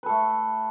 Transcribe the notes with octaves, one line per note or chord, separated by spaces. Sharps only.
A3 A4 B4